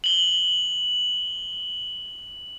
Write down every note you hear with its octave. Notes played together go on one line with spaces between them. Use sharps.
F#7 G7